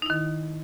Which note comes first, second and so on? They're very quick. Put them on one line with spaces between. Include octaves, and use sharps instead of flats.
D#4 E4 D#3